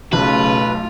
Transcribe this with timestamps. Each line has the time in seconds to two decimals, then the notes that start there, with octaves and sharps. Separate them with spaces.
0.13 B1 C#3 A3 F4 B4